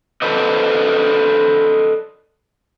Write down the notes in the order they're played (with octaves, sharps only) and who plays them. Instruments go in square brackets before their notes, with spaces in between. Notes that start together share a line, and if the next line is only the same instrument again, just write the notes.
[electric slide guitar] A4 B4 C5 D5 D#5